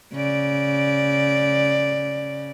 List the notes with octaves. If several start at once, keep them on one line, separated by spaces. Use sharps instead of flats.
C#3 D5